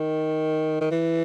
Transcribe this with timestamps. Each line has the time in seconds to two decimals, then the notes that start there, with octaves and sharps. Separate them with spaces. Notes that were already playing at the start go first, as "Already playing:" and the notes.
Already playing: D#3
0.81 D#3
0.91 E3